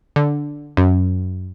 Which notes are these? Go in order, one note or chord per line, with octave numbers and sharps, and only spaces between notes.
D3
F#2